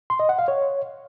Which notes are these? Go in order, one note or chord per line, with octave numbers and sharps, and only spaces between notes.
C6
D#5
F#5
F5
C#5